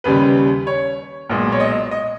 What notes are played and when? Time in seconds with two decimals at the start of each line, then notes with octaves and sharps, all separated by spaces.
0.04 D#2 C#3 G3 B4
0.67 C#5
1.30 B1 A#2 G#3
1.52 C#5
1.60 D#5
1.91 D#5